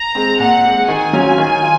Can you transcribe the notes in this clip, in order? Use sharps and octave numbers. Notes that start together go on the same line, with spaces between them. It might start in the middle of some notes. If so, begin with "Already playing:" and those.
Already playing: A#5
G#3 C4
A#2 F#5
G#3 C4
D#3 G#5
F#3 C#4 F4
D#3
F4